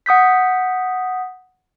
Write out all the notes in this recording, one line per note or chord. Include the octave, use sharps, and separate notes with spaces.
F#5 D#6 G6 B6